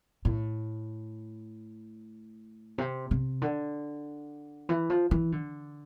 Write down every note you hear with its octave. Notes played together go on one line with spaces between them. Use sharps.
A2
C3
C3
D3
E3
F3
E3
D3